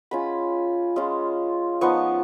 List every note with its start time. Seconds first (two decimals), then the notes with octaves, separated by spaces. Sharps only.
0.11 G#3 C#4 F4 B5
0.96 G#3 C#4 F4
1.81 F3 B3 D#4 C#6